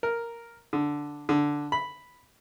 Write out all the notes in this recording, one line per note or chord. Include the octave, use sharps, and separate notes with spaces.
A#4
D3
D3
B5